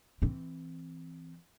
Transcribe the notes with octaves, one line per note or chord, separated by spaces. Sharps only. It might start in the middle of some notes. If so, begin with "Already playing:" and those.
E3 C4